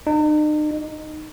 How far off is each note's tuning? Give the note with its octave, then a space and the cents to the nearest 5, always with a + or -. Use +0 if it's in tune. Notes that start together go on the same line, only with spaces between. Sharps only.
D#4 -45
D#4 -15